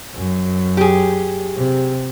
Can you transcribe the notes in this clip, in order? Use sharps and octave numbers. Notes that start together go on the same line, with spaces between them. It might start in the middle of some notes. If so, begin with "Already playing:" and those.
F#2
G4 G#4
C3